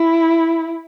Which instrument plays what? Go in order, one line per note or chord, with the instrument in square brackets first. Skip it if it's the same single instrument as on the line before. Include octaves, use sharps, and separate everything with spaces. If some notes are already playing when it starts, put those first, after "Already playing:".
Already playing: [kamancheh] E4